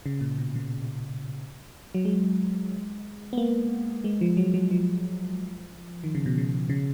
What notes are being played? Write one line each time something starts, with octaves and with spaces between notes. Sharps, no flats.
C#3
A#2
B2
C#3
F#3
G#3
B3
A#3
G#3
F3
F#3
F#3
F3
D#3
C#3
B2
C#3
C#3